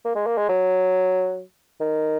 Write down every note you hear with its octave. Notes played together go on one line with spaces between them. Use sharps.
A#3
G#3
A#3
G#3
F#3
D#3